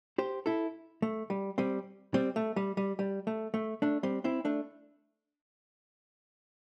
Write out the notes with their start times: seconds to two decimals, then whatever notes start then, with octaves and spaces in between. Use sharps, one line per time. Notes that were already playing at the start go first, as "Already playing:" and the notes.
0.18 G4 C5
0.46 E4 A4
1.02 A3
1.30 G3
1.58 G3 C4
2.14 G3 C4
2.36 A3
2.56 G3
2.77 G3
2.99 G3
3.27 A3
3.54 A3
3.82 A3 D4
4.03 G3 C4
4.24 C4 E4
4.45 A3 D4